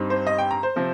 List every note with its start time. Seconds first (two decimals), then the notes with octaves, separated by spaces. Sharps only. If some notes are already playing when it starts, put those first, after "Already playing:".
Already playing: G2 G3 C4 D#4
0.10 C5
0.27 D#5
0.38 G5
0.51 A#5
0.63 C5
0.76 C3 F3 C4